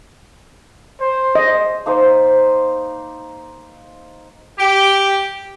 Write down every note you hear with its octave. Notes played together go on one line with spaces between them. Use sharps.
C5
D#5
A#3 D#4 C5
G4